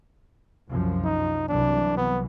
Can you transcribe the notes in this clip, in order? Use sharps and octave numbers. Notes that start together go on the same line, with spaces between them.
C2 F#2 F3
D#4
C2 E3 F#3 D4
B3